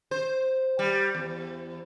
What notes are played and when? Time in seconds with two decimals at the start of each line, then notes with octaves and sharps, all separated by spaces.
0.11 C5
0.79 G3
1.15 E2